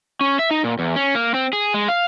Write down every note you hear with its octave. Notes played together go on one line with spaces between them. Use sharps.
C#4
E5
D#4
A#2
E2
C#4
A#3
C4
G#4
G#3
F5